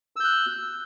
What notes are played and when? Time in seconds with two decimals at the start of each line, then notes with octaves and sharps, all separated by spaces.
0.16 E6
0.20 G6
0.24 F#6